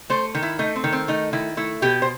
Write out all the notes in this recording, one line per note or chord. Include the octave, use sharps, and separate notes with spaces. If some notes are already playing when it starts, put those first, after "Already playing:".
A3 C5
D#3
E4
A3 D#4
C4
D#3
C4
A3 D#4
D#3 E4
A3 E4
B2 G4
C5